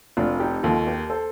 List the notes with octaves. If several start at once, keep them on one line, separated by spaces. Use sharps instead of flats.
F1 D4 F4
D#4 G4
D#2 D#3 F4 A4
G4 A#4
A4 C5